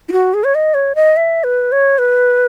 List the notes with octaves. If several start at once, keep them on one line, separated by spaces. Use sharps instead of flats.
E4
F#4
G#4
C#5
D#5
C#5
D#5
E5
B4
C#5
B4